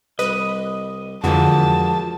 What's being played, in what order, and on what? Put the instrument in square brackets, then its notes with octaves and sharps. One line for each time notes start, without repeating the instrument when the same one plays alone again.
[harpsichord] C2 [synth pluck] B4 [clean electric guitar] D#5
[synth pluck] F2 D3 E3 [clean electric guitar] F3 F#4 [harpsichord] G#3 A#3 [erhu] A5